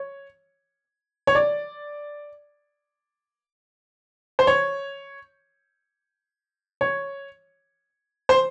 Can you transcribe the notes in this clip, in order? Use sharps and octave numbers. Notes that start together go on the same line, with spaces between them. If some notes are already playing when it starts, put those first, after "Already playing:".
Already playing: C#5
C#5
D5
C5
C#5
C#5
C5